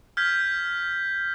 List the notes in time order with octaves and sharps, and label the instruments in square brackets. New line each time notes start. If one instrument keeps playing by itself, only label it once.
[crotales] F6 G6 G#6 B6